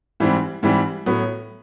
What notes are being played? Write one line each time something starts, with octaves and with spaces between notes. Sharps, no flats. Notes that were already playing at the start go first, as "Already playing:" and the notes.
G#2 E3 G3 C4
G#2 E3 G3 C4
A2 F#3 B3